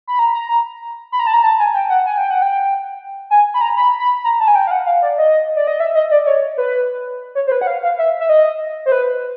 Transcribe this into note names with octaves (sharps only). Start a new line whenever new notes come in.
B5
A#5
A#5
B5
A#5
A5
A#5
A5
G#5
G5
F#5
G#5
G5
F#5
G5
G#5
B5
A#5
B5
B5
A#5
A5
G#5
G5
F5
F#5
F5
D5
D#5
D5
D#5
E5
D#5
D5
C#5
B4
C#5
C5
B4
F#5
F5
F5
E5
E5
D#5
C5
B4